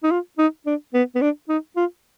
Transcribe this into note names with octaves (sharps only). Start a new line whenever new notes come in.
D#4
F4
D#4
D4
B3
B3
D4
D#4
F4